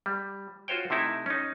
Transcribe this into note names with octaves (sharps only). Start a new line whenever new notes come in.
G3
F4 F#4 C5 C#5 G5
C3 A3 D#4 E4 E5
C#4 D#4